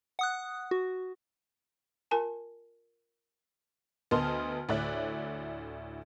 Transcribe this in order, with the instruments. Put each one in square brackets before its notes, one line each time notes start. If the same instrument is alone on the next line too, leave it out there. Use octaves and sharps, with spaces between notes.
[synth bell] F#5 D#6 F#6
F#4
[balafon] F4 A#4 G#5 A5
[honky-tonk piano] D2 B3 D#5 A5 C6 F6
D2 A2 C#5 D5 E5 F#6